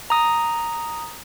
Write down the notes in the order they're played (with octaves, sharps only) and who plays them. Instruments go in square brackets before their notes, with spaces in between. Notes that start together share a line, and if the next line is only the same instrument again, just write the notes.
[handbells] A#5 D#6